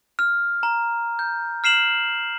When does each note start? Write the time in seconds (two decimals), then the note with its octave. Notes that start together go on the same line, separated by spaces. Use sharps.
0.19 F6
0.63 A#5
1.19 G6
1.64 F6 C7 E7 F#7